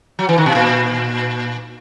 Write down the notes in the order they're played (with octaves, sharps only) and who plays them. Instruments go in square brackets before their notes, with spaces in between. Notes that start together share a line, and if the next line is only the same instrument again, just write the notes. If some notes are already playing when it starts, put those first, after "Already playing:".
[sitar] F#3
E3
D#3
B2
A#2